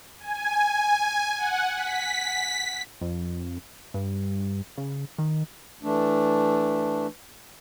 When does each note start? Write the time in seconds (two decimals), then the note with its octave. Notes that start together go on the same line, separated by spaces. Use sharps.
0.20 G#5
1.37 F#5
1.75 B6
3.01 F2
3.94 G2
4.78 C#3
5.18 D#3
5.83 E3 A3 D4